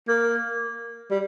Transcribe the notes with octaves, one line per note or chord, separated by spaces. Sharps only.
A#3
G3